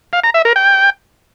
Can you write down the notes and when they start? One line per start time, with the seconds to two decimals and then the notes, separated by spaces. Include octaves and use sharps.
0.13 F5
0.24 A#5
0.34 E5
0.45 A#4
0.56 G5